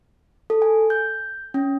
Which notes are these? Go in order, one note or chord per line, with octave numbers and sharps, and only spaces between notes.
A4
G#5
G6
C#4